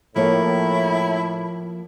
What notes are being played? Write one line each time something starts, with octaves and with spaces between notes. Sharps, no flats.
A2 F3 A#3 E4 C#5